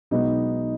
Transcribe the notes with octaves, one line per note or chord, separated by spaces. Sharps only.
B1 B2 G#3 B3 D#4 D#5